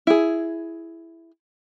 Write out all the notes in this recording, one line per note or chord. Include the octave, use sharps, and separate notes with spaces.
E4 G#4